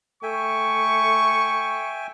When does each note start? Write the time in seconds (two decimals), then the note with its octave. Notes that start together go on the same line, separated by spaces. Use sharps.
0.23 A3 E5 G5 G#5 C#6